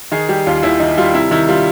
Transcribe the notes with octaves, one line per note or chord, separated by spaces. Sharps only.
D#3 G#4
G3 G4
D#2 F4
D#2 E4
D#3 D#4
G3 F4
C3 E4
D#3 E4
G3 F4